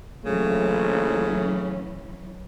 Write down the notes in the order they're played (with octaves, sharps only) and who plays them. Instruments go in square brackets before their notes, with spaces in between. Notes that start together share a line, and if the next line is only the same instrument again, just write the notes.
[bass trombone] A#1 [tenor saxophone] C#3 [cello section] E3 F#3 C#4 [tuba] A3